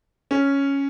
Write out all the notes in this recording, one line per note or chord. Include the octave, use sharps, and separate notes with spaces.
C#4